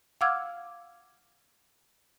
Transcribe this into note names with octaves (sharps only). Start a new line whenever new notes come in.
F5 F#5 D6 E6 F6 G#6